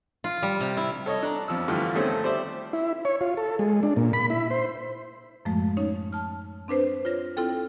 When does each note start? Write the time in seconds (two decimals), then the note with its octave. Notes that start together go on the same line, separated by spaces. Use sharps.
0.24 F4
0.43 G3
0.60 C3
0.77 E4
1.06 A4 C#5 D#5
1.23 D4 A#5
1.48 F2 F3 E6
1.68 G2 D3 E3 F3 A3 F4
1.96 D#3 A3 C4 C#4 G#4 A4
2.23 G4 C5 D5 E5
2.73 E4
3.05 C#5
3.21 F4
3.37 A4
3.59 G#3
3.83 D4
3.97 A#2
4.13 B5
4.30 E4
4.51 C5
5.45 F#2 A2 F3 G#3 A3
5.77 C#4 D#4 C#5
6.12 A5 F6
6.68 C4 D4 B4 C5
7.05 F4 C#5 A#6
7.37 C4 E4 F4 A4 G5